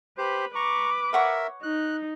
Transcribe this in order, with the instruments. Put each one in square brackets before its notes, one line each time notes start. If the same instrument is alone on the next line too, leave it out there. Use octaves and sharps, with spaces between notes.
[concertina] G4 C5 [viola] B4
[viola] B4 D6 [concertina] A#5 C#6
[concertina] A#4 E5 [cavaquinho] C#5 F#5 C#6
[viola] D#4 [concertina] F#6